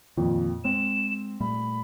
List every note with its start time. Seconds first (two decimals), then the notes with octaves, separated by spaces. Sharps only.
0.17 F2 A#2 D#3
0.64 G#3 C4 E7
1.41 A#2 G3 A3 B5